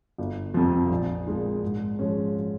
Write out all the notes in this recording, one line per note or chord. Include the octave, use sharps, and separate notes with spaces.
G1
F2 C3 F3
A#1
A#2 G#3 D#4
G#2
F3 G#3 C#4